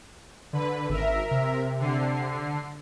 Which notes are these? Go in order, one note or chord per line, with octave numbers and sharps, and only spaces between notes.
D3 B4
G#1 A#4 E5
C3
D3 C7